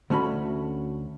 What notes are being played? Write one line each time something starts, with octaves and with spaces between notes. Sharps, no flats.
D2 A3 C#4 F#4 B5